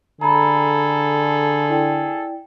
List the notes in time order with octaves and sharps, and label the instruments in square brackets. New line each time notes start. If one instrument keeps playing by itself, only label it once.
[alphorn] D3 [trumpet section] G#4 A4 [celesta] A#5 B5
[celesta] E4 D5 G5